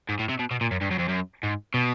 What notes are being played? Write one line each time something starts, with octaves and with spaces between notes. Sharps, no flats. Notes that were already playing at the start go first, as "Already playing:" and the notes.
G#2
A2
C3
B2
B2
A#2
F#2
G2
F#2
F2
F#2
G#2
B2